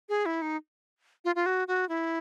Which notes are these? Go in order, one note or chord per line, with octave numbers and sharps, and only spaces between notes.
G#4
E4
D#4
F4
F4
F#4
F#4
E4